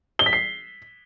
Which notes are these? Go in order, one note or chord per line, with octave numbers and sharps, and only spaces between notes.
G7
B6
C7